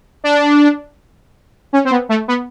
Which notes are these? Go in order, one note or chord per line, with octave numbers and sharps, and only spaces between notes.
D4
C#4
C4
B3
A3
B3